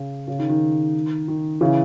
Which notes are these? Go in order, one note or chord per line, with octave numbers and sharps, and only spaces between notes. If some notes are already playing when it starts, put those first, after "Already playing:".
Already playing: C#3
C#3
D#3
D#3
D#3
C#3 E3